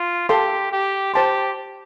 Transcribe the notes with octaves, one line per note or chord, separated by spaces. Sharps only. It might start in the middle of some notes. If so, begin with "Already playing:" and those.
Already playing: F4
G4 A4 F5 A5 C6
G4
G4 C5 A5 C6